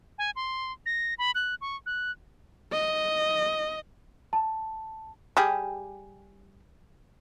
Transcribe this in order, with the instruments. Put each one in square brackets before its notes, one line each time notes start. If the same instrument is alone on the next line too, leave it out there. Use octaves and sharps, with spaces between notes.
[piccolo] G#5
C6
A#6
B5
F#6
C#6
F#6
[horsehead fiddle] D#5
[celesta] A5
[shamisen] G3 G4 G#4